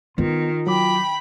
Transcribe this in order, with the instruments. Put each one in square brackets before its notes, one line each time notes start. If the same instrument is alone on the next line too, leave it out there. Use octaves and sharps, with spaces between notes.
[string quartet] D#3 [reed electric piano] B3 [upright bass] F4
[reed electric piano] F#3 D6 [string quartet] G5 B5